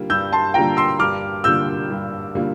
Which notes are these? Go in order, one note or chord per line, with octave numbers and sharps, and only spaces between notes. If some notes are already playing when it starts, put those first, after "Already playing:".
Already playing: D3 G3 A#3 F4
G2 E6 G6
A5 C6
D3 G3 A#3 F4 G5 A#5
C6 E6
G2 D6 F6
D3 G3 A#3 F4 E6 G6
G2
D3 G3 A#3 F4